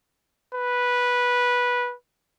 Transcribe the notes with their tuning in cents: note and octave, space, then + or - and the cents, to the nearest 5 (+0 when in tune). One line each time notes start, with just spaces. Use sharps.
B4 -10